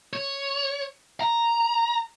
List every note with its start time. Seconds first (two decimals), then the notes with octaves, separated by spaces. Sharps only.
0.13 C#5
1.21 A#5